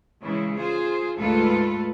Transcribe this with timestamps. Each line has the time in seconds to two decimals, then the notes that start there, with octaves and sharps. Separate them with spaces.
0.22 C#3 E3 G#3 E4
0.56 F4 G#4 C5
1.16 D2 G#2 G#3 F4 A4 B4